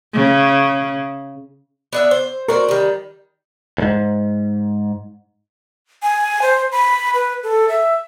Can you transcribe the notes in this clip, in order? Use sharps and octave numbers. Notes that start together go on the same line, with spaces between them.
C#3
B3 D4 E5
C5
F#4 A#4 C5 D5
D#3 G3
D2 G#2
G#5
C5
B5
B4
A4
E5